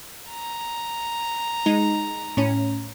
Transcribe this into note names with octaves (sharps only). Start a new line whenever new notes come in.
A#5
G#3 D#4
A2 C#4